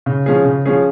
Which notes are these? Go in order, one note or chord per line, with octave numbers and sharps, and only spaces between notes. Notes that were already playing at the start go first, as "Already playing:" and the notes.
C#3
F3 C#4 G#4
C#3
F3 C#4 G#4